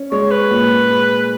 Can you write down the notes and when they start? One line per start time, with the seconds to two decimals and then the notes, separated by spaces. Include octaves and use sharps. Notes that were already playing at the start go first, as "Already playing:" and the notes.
Already playing: C#4
0.11 G#3 C#5
0.31 B4
0.51 A#2
0.90 G#3